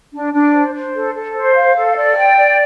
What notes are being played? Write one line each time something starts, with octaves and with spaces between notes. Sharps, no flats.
D4
D4
C5
C5
A4
A4
C5
F5
A4
D5
G5
D5